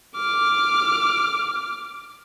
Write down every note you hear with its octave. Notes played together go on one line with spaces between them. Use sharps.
D6 F6